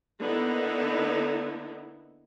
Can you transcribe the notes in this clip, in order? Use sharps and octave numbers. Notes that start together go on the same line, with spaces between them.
D3 A#3 B3 D#4 E4